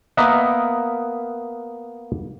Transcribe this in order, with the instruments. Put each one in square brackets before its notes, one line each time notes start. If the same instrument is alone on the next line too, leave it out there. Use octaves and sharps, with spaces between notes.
[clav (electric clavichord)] A#3 B3 A#4 D#5 E5 F#5